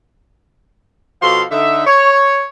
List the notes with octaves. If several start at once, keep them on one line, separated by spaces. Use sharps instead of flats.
B2 F3 F#4 A4 F5 C6
D3 D#4 E5
C#5